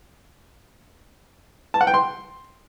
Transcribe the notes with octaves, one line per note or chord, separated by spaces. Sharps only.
A5
F#5
G5
C6